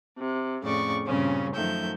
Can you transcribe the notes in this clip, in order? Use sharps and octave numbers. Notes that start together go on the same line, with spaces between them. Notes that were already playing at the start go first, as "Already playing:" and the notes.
C3
F2 A2 C#3 D5 C#6
G2 A#2 C#3 C4 C#4
F#2 D#3 F3 A3 E5 G6